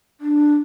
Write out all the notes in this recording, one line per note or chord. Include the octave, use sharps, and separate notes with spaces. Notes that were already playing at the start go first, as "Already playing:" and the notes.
D4